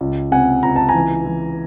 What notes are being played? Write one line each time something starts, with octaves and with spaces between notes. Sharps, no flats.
C#2
C3 F#5 G#5
C#2 A#5
A5
G#5 A#5
E3
E3